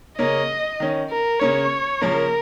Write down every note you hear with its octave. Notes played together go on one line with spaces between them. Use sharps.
C#3 A#3 C#4 D#5
D#3 C#4
A#4
C#3 A#3 C#4 C#5
C#3 F3 A#3 C#4 A#4